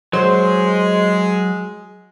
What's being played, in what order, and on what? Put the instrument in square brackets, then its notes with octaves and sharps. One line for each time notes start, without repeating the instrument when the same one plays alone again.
[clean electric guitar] F#3 [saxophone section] G#3 [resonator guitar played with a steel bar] C5